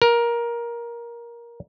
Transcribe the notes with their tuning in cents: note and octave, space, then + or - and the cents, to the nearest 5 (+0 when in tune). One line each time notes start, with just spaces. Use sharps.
A#4 +15